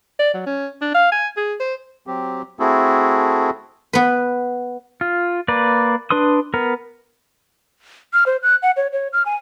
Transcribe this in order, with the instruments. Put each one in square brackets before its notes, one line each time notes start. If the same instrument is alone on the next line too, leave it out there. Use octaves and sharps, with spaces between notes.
[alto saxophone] D5
F#3
C#4
D4
F5
G#5
G#4
C5
[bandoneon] F#3 C4 G4
A3 C4 E4 F#4 G#4 A4
[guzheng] B3 B4
[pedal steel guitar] F4
A#3 B4 D5
D4 B4 C6 D#6
B3 A#4
[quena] F6
C5
F#6
F#5
C#5
C#5
F6
G#5